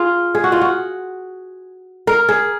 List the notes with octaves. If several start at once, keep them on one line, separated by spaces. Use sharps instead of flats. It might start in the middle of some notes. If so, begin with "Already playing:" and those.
Already playing: F4 G#4
G#4
F#4
F4
F#4
A#4
G#4